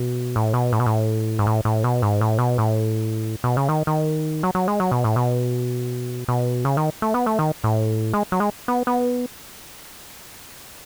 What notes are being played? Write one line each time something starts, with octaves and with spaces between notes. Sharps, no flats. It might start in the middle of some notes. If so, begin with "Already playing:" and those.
Already playing: B2
A2
B2
A2
B2
A2
G#2
A2
A2
B2
G#2
A2
B2
A2
B2
C#3
D#3
D#3
F#3
F#3
G#3
F#3
B2
A2
B2
B2
C#3
D#3
A3
B3
A3
D#3
A2
G#3
F#3
G#3
B3
B3